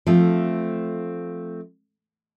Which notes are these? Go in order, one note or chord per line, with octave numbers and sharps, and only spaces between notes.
F3 A3 C4